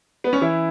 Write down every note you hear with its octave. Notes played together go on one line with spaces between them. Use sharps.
B3
C#4
E3 E4